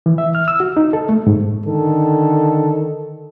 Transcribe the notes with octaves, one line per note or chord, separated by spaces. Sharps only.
E3
E5
F6
E6
F#4
D#4
A4
A3
G#2
D3 D#3 A4